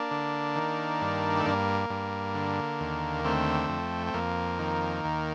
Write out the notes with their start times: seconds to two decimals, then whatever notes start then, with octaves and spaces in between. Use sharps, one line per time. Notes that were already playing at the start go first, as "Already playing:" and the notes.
Already playing: A#3 D4
0.11 D3
0.55 D#3
1.01 G2
1.40 A3
1.45 G2 A#3
1.90 G2
2.35 D3
2.80 D#2
3.24 D3 A3 C4
3.69 F2
4.07 C4
4.14 F2 A#3
4.59 D#3
5.04 D#2